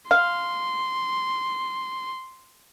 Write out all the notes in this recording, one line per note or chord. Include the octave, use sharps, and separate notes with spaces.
F5 C6